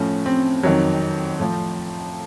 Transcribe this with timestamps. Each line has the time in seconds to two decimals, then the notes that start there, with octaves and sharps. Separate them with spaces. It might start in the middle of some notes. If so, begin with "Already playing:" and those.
Already playing: A2 F3 C#4
0.26 C4
0.63 F2 D#3 F#3
1.40 A2 F3